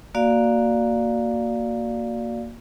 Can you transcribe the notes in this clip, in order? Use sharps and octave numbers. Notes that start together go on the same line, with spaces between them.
A#3 F#4 D5 F5